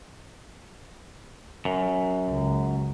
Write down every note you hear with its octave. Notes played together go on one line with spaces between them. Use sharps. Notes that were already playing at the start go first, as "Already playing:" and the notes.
F#2
C#2